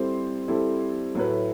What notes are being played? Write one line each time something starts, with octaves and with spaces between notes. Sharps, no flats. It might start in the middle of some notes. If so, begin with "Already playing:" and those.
Already playing: G3 C4 E4 A4 C5
G3 C4 E4 A4 C5
A2 F#3 A3 E4 B4